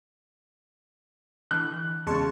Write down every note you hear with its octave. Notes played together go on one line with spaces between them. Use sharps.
D3 E3 F#6
E2 C#3 G#3 A5 C#6